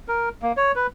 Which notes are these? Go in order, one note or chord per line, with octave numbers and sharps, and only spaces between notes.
A#4
A#3
C#5
B4